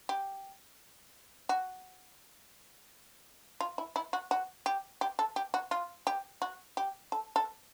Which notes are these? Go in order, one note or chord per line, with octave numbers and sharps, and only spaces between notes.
G4
F#4
F4
E4
E4
F#4
F#4
G4
G4
A4
G4
F#4
F4
G4
F#4
G4
A4
A4